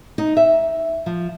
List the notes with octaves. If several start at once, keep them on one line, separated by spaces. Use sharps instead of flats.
D#4
E5
F3